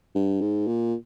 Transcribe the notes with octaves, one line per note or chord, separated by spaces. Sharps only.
G2
G#2
A#2